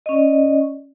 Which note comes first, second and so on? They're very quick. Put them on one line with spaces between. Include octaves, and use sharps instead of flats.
D#5 C#4 D5